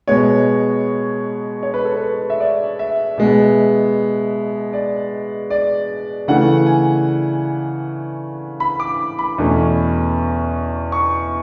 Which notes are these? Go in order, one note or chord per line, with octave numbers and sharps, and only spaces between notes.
B2 G#3 B3 C#5
C#5
B4
A4
B4
E5
D5
E5
B2 G#3 B3
D5
D5
C#3 E3 A3 F#5
G#5
B5
D6
B5
E2 B2 A3 C#4
C#6